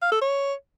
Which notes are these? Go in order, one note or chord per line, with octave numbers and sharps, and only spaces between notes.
F5
A4
C#5